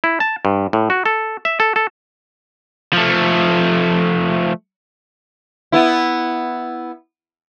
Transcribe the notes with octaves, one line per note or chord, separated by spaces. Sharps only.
E4
A5
G2
A2
F#4
A4
E5
A4
A4
F3 A3
B3 E4